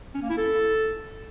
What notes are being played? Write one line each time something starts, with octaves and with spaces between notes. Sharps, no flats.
C#4
A#3
E4
A4